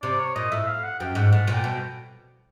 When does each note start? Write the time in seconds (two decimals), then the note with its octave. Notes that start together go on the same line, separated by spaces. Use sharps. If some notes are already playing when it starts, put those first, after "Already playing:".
0.02 C3 D5
0.19 C#5
0.35 A#2 D#5
0.51 A2 E5
0.67 F5
0.84 F#5
1.00 F#2 G5
1.15 G#2 F#5
1.32 A2 F#5
1.47 A#2
1.54 G5
1.64 B2